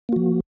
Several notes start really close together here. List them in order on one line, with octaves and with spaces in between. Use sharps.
A#3 F#4 F3